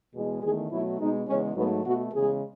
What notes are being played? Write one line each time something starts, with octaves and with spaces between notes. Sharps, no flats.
E2 B2 G#3
E2 D#3 A3 G#4
B2 F#3 A3 E4
B2 G#3 D#4
E2 C#3 G#3 C#4
G#2 F#3 A3 B3
B2 A3 F#4
E2 C#3 G#3 G#4